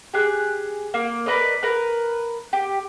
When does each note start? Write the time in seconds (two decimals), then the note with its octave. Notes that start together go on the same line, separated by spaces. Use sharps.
0.14 G4 G#4 F#6
0.94 A#3
1.26 A#4 B4 D5 D#5
1.63 A#4 B4
2.53 G4